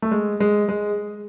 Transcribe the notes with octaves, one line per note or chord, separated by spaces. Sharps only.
A3
G#3
G#3
G#3